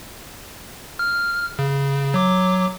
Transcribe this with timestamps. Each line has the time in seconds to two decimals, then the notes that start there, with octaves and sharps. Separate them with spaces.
0.99 F6
1.59 C#3
2.14 F#3 D6